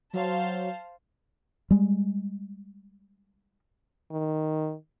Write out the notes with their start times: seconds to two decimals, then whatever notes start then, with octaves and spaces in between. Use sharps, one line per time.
0.13 F#3 C5 F5 A5
1.71 G3 G#3
4.11 D#3